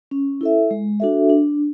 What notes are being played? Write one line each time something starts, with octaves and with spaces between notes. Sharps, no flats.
C#4
E4 A4 E5
G#3
D4 F#4 A4 E5
D4